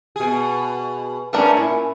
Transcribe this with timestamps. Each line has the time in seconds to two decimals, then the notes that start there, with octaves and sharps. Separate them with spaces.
0.16 B2 G#4
1.33 A3 C#4 D4 A#4 B4
1.57 A#2 E4